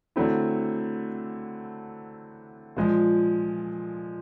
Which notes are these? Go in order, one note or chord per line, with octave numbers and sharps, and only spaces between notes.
D3 F#3 A3 C4 E4
A#2 F3 G#3